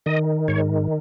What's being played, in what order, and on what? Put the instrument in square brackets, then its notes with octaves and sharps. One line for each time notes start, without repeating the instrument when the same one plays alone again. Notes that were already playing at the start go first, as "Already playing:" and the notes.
[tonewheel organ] D#3 D#5
G#2 C#5